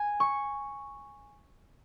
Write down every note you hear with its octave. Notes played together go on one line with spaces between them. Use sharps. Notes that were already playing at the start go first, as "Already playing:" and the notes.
Already playing: G#5
C#6